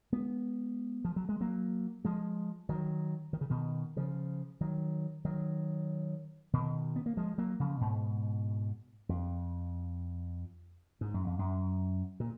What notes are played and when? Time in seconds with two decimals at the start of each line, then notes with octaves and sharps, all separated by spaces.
0.12 G#3 B3
1.05 F3
1.16 F#3
1.29 G#3
1.41 F#3 A#3
2.05 F3 G#3
2.69 D#3 F#3
3.33 D#3
3.41 C#3
3.50 B2 D#3
3.96 C#3 F3
4.61 D#3 F#3
5.25 D#3 F#3
6.53 B2 D#3
6.96 B3
7.06 A#3
7.17 F3 G#3
7.38 F#3 A#3
7.60 C#3 F3
7.80 G#2 B2
9.09 F2
11.01 G#2
11.14 F#2
11.27 F2
11.39 F#2
12.20 A#2